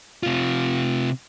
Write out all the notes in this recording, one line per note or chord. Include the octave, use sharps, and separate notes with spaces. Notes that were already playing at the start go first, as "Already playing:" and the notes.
C3 F4